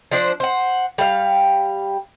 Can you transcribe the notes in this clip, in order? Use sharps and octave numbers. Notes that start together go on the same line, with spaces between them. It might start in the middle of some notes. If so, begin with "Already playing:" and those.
F3 D4 C5
C5 F#5
G3 F5